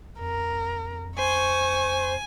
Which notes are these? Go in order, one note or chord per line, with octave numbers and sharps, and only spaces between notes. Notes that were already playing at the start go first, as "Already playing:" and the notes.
F2 A#4
C5 G#5 C#6